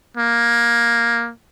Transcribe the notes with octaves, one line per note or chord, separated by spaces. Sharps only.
A#3